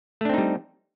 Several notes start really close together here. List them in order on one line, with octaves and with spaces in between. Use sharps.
A3 D4 C4 D#4 G3